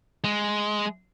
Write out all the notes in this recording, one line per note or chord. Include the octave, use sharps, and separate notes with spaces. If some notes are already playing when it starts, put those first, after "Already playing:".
G#3